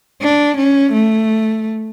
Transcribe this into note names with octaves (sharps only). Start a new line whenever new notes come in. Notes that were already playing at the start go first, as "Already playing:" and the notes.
D4
C#4
A3